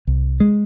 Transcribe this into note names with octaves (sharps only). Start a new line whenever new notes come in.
C2
G#3